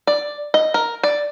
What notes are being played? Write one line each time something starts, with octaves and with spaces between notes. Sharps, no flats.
D5
D#5
A#4
D5